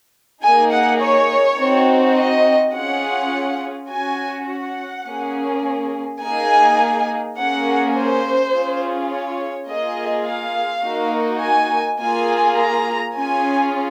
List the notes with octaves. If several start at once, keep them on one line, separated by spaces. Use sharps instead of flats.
A#3 D#4 G#4 G#5
F#5
C#5
C4 D#4 F#4
D#5
C#4 F4 G#4 F#5
C#4 F#4 G#5
F#5
A#3 C#4 G#4
A#3 D#4 G#4 G#5
A#3 C#4 G#4 F#5
C5
C#4 F4 G#4
C#5
A#3 F4 G#4 D#5
F5
A#3 D#4 F#4
G#5
A#3 F4 G#4 G#5
A#5
C#4 F4 G#4 G#5